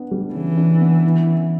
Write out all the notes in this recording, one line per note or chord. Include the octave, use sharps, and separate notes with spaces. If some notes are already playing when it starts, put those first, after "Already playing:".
Already playing: B3 D4
G3
C#3 E3
D4
B3
E4
C#4